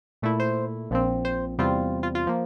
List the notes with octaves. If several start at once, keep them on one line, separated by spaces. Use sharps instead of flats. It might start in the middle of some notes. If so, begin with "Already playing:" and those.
A#2 A3 E4
C5
A#1 A#2 F3 C4
C5
E2 C3 G3 C4 F4
F4
F4
F3 A#3